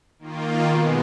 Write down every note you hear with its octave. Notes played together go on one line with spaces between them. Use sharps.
D#3 A#3 F4
B2 G#3 B3